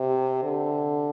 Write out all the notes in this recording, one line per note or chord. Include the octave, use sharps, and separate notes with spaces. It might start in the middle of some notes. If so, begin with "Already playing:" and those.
Already playing: C3
D3